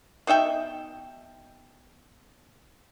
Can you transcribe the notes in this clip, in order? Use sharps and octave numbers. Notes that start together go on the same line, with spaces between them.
B2 D#4 E5 G5